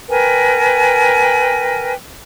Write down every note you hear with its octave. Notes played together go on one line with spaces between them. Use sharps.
A#4 B4 G5 G#5